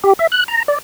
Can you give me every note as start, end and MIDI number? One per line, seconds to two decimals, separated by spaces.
0.04 0.13 67
0.19 0.27 76
0.32 0.44 90
0.48 0.63 82
0.68 0.78 74